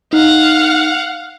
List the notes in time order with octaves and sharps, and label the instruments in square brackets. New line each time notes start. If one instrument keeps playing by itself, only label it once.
[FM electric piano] D#4 [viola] F5 F#5